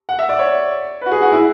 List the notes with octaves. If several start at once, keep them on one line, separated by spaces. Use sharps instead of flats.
F#5
E5
D5
C#5
B4
F#4
G#4
F#4
E4